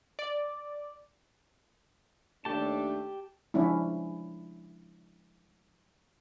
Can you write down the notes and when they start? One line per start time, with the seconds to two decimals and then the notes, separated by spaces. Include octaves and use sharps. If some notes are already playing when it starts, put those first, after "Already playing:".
0.19 D5
2.45 D#2 A3 D4 G4 A5
3.54 F3 G#3 C#4 D4 E4